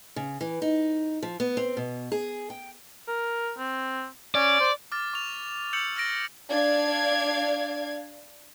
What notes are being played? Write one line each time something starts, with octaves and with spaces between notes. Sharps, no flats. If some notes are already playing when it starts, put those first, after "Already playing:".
C#3
E3
D#4
F3
B3
C4
B2
G#4
G5
A#4
C4
C#4 D5
C5
D6 F6 A6
C#6 F7
E6 G6 C#7 F7 F#7
F6 A6 A#6 D7
D4 D5 F5 G#6